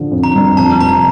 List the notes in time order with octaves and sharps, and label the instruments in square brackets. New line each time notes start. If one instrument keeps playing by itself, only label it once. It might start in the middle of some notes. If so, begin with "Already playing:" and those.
Already playing: [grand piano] D3 F3
F2
[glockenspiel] A#5
[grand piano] G1
[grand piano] F2 [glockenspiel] A5
[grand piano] F1 [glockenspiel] A#5